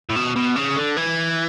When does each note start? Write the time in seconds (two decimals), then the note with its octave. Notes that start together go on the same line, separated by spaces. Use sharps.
0.10 A2
0.16 B2
0.36 B2
0.56 C#3
0.76 D3
0.97 E3